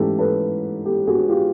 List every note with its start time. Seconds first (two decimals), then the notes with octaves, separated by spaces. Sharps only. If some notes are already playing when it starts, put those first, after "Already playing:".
Already playing: G#2 E3 A3 C#4 G4 A4
0.19 A4 B4
0.85 G4 A4
1.07 F#4 G#4
1.29 F4 G4